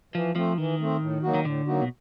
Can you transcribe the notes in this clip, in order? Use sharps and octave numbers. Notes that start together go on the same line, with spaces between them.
E3 F3
F3 A3 C4
D#3 E3
A3 C4
A2
F#3 A#3 D#4 F#4
D#3
A2 D3
F#3 A#3 D#4 F#4
B2